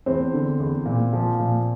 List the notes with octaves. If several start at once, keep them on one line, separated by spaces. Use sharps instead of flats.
E2 C4 C5
D3
E2
A#2
F3
A#2